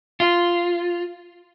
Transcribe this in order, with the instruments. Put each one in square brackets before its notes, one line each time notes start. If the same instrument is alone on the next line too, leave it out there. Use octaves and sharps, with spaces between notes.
[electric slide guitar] F4